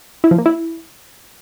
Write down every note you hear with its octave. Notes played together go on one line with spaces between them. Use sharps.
E4
F3
A#3
E4